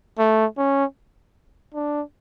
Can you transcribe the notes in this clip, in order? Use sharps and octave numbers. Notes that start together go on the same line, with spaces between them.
A3
C#4
D4